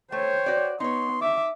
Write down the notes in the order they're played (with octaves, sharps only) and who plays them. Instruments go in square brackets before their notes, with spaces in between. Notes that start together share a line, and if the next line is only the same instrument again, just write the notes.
[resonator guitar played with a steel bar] A3 [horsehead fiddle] C5 C#5 [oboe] G5
[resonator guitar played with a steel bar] F#4 D5
[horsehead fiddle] B3 [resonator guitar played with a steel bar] D#4 C#5 [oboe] C6
[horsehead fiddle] E5 [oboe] D6